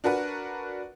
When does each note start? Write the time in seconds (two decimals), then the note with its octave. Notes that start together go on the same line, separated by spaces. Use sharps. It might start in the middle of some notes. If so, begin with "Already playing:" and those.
0.04 D4 F#4 A#4 B4 F#5